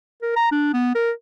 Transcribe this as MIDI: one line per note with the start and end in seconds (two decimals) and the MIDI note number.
0.22 0.32 70
0.36 0.49 82
0.52 0.72 62
0.74 0.92 59
0.95 1.11 70